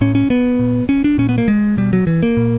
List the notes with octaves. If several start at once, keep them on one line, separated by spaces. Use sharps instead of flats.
A2 C#4
C#4
B3
A#2
C#4
D4
A#2 C#4
B3
A#3
G#3
B2 G3
F#3
E3
A#3
A#2